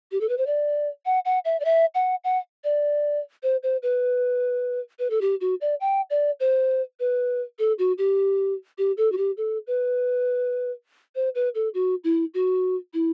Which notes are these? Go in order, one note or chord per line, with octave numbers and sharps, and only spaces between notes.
G4
A4
B4
C5
D5
F#5
F#5
E5
D5
E5
F#5
F#5
D5
C5
C5
B4
B4
A4
G4
F#4
D5
G5
D5
C5
B4
A4
F#4
G4
G4
A4
F#4
G4
A4
B4
C5
B4
A4
F#4
E4
F#4
E4